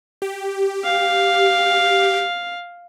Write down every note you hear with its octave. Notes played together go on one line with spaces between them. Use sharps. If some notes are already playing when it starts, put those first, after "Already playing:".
G4
F5